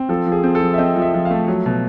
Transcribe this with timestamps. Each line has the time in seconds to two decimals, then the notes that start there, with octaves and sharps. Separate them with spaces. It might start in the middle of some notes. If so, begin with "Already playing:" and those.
Already playing: C4
0.09 F3 A4
0.26 F3
0.32 G#4
0.43 C4
0.55 A4
0.61 F3
0.74 E5
0.78 C4 D#5
0.96 F3
1.02 E5
1.14 F3
1.25 F5
1.31 A3
1.48 F#3
1.66 B2